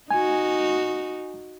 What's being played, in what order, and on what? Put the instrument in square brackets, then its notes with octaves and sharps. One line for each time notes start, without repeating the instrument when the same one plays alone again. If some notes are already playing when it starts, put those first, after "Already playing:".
[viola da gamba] D#4 F#4 [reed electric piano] G#5